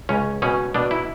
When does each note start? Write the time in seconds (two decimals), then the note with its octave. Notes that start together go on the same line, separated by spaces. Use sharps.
0.09 C#2 C#4
0.42 B2 C#4
0.74 B2 D4
0.91 E4